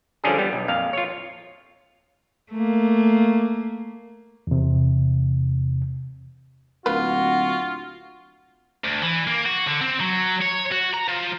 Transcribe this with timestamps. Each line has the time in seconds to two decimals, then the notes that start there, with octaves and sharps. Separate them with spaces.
0.24 D3 F3 G3 C#4 D4 G#4
0.38 G3 B3
0.53 B1
0.68 F2 A#2 F5
0.93 F4 C#5
2.52 A3 A#3
4.47 E2 C3
6.86 D1 A#3 F4 F#4 B4
8.84 D2
9.02 E3
9.27 A#3
9.46 F#4
9.67 D3
9.82 C4
10.00 F#3
10.41 C#5
10.71 F#4
10.93 A#5
11.08 F3